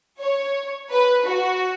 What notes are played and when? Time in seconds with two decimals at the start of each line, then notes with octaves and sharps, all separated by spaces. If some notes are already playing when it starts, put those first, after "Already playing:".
0.19 C#5
0.90 B4
1.25 F#4